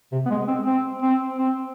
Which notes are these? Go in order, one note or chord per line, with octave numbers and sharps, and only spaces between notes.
C3
B3
G#3
C4
C4
C4
C4